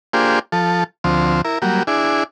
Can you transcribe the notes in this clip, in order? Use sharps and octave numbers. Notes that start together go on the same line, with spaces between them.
A#3 D4 F4 G4 G#4 C5
F3 A4
D2 F3 C4
E4 A#4
F#3 G3 A#3
D4 E4 G#4